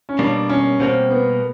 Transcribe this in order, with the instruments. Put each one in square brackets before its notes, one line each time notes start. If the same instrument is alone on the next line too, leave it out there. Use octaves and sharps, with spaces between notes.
[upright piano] C#4
[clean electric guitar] B2 G3 A#3 [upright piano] D4
[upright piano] C#4
[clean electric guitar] B2 G3 A#3 [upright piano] C4
[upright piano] B3